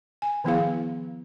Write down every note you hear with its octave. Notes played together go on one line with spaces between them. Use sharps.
G#5
D#3 F3 B3 E4 G#4 F5